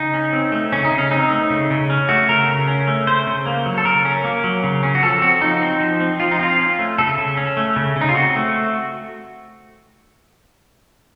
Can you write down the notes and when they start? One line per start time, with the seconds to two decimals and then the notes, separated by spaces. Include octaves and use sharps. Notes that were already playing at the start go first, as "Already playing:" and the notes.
Already playing: C#3 D#4
0.14 C#4
0.33 C4
0.52 A3
0.72 C#3 C#4
0.85 D#4
0.91 C#3
0.98 C#4
1.11 C4 D#4
1.30 A3
1.50 C#3
1.70 C#3
1.90 C#4
2.09 A3 F#4
2.28 C#3 A#4
2.48 C#3
2.67 C#4
2.88 A3
3.07 C#3 C5
3.27 C#3
3.46 A#3
3.66 F#3
3.78 A4
3.85 C#3 A#4
4.05 C#4
4.24 A#3
4.44 F#3
4.64 C#3
4.83 C#4
4.95 F#4
5.03 F3 A4
5.22 C4 F#4
5.41 F3 D#4
5.62 C4
5.80 F3
6.00 C4
6.20 F3 F4
6.31 D#4
6.39 C4 F4
6.59 C#4
6.79 A3
6.98 C#3 A4
7.18 C#3
7.37 C#4
7.57 A3
7.76 C#3
7.96 C#3
8.01 D#4
8.09 F4
8.15 C4 F#4
8.36 A3